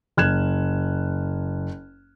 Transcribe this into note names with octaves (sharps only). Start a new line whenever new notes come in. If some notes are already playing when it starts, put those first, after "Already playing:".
F#1 F#6 G#6 E7